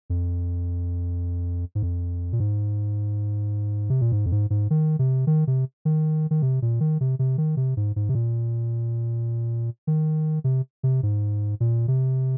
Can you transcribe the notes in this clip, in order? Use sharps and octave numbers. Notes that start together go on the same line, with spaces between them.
F2
G#2
F2
A#2
G#2
C3
A#2
G#2
F2
G#2
G#2
D#3
C3
D#3
C3
D#3
D#3
C3
A#2
D#3
C3
C3
D#3
C3
G#2
G#2
C3
A#2
D#3
C3
C3
G#2
A#2
C3